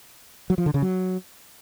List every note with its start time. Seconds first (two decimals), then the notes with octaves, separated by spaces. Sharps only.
0.50 F#3
0.58 F3
0.66 D3
0.74 C#3
0.82 F#3